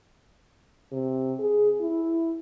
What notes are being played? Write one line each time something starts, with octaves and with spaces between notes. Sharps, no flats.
C3
G#4
E4